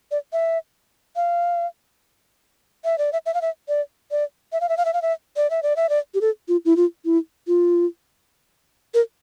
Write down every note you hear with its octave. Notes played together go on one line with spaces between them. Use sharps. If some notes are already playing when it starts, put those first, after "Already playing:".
D5
E5
F5
E5
D5
E5
E5
F5
E5
D5
D5
E5
F5
E5
F5
E5
F5
E5
D5
E5
D5
E5
D5
G4
A4
F4
E4
F4
E4
F4
A#4